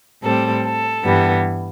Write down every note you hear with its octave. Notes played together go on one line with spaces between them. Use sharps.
A2 G3 C4 A4
A4
G2 E3 G3 B3